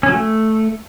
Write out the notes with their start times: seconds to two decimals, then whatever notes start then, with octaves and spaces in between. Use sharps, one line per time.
0.03 C#4
0.08 F#3
0.14 A3